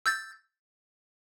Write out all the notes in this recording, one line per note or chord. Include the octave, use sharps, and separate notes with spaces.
E6 G6 A6